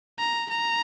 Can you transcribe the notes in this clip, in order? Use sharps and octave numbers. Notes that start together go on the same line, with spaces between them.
A#5
A#5